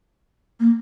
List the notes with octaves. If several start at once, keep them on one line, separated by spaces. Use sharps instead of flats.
A#3